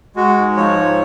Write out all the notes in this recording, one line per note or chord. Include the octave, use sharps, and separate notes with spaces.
G#3 F#4
G#2
F3 C#5
G#2